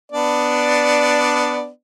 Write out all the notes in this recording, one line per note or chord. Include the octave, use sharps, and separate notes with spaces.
B3 D4 D5